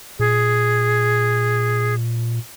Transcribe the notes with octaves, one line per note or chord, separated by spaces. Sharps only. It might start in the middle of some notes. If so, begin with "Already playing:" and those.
A#2 G#4